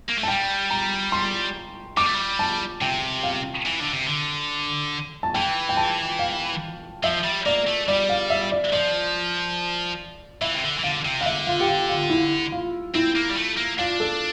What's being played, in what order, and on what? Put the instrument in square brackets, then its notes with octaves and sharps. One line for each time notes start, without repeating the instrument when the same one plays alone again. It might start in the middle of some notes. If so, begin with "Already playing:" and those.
[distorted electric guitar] A#3
A3
[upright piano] A5
[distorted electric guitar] G3 [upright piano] G5
[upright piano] A#5
C6
[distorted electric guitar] G3 [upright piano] D6
[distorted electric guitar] A3
G3
[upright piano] A5
[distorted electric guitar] C3 [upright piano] G5
[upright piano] F5
[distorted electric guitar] E3
D3
C3
D3
[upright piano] A5
[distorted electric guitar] E3 [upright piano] G5
[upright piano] G5
A5
F5
[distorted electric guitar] F3 [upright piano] E5
[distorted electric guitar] G3
[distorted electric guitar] A#3 [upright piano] D5
[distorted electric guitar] A3
[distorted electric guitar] G3 [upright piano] D5
[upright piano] F5
E5
D5
[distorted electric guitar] F3 [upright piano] D5
[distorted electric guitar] E3 [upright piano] E5
[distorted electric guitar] C3
D3
E3
[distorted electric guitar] D3 [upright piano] F5
[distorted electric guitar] C3
[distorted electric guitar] E3 [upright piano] F5
[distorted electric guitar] D3 [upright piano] E5
[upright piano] F4
G4
F4
F4
E4
F4
[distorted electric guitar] C4 [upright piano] E4
[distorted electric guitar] A#3
G3
A3
A#3
[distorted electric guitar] D4 [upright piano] F4
[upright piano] A4